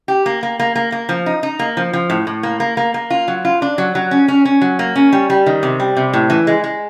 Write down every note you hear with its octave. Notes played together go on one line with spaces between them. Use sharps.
G4
A#3
A#3
A#3
A#3
A#3
F3
D#4
D#4
A#3
F3
F3
A2
A2
A#3
A#3
A#3
A#3
F4
F#3
F4
D4
F#3
F#3
C#4
C#4
C#4
F#3
A#3
C#4
G3
G3
D#3
C3
G3
C3
A2
E3
G#3
G#3